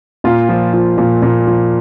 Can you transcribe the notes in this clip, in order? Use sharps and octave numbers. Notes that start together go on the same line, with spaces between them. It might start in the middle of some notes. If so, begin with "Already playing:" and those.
A#2 F4
F3
F3
A#2
A#2
F3